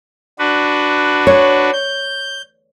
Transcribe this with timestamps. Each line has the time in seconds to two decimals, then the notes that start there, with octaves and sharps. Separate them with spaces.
0.39 D4 F#4 B4
1.27 C#5
1.73 G6